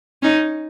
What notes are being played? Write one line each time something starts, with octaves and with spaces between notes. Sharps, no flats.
C#4 D#4